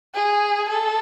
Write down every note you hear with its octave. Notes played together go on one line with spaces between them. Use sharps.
G#4
A4